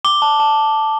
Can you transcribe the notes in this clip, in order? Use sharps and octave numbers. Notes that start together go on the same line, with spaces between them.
D6 G7
A5
A5